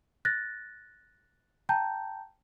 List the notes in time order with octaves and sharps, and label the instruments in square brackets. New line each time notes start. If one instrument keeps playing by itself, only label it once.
[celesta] F#6 A6 A#6
G5 A5 A#5 G6